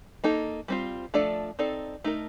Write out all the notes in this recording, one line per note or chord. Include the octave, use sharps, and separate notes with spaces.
A#3 D#4 A4
G3 C4 F4
F3 A3 D4 A4 D5
C4 D#4 A4 D5
A3 D#4 A#4